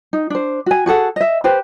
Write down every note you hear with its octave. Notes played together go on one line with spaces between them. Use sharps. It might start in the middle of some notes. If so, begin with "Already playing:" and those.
D#4
D4 C5
F#4 G#5
F#4 G#4 A4 F#5
D#5 E5
G4 B4 C5